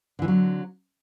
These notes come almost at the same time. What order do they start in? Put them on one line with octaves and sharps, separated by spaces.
D3 E3 C4 F#3